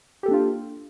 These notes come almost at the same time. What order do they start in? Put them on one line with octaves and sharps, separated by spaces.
G4 A4 A#3 D4 F4